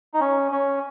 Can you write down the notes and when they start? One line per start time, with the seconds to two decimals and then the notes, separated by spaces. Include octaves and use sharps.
0.14 D#4
0.21 C#4
0.52 C#4